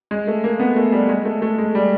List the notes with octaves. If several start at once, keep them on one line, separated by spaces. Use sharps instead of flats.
G#3
A3
A#3
B3
A3
G3
G#3
A3
A3
G#3
G3